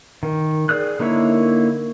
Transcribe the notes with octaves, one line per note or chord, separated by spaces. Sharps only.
D#3
G#4 D5 D#6 F#6
D3 A#3 D#4 E4 C#5